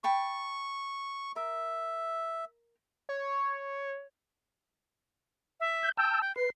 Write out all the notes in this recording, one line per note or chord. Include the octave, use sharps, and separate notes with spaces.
G5 A5 B5 C#6
A#4 E5
C#5
E5
G6
G5 A5 E6
G5
B4 C7